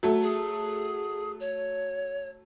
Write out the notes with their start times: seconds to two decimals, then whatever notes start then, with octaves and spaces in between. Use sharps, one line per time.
0.03 F#3 A3
0.23 G#4
1.40 C#5